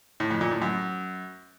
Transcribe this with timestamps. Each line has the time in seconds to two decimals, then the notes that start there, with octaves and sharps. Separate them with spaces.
0.20 A2
0.30 F2
0.41 A#2
0.51 A2
0.62 F#2